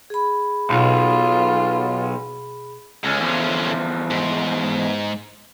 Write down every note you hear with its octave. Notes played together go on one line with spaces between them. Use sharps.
G#4 B5
B1 B2 F4
C#2 D3 C#4
E2 F3
G#2